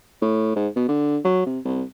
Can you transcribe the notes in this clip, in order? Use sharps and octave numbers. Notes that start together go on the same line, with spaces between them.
A2
G#2
B2
D3
F#3
C3
C2